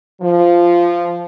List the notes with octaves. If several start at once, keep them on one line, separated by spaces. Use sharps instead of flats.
F3